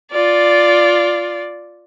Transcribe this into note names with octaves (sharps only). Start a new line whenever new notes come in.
F4 D5